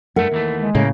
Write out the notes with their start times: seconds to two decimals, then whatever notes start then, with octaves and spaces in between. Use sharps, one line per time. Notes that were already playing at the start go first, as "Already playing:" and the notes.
0.16 G2 A3 A#4 E5 F#5
0.32 D#2 E3 A3
0.58 G#3
0.75 A2 C#3 A#3